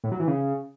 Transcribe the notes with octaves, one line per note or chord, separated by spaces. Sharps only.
A2
F#3
E3
C#3